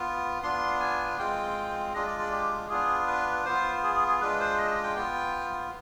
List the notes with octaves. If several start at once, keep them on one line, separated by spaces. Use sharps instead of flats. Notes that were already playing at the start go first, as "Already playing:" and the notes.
Already playing: B3 F4
B3 D4 F4 C6
G#5
G#3 C4 F4 G5
G#3 D4 F4 D#5
D5
D5
G4
B3 D4 F4 G#4
B4
B3 F4 C5
G#4
G#4
G#4
G#3 D4 F4 B4
C5
D#5
D#5
G5
B3 F4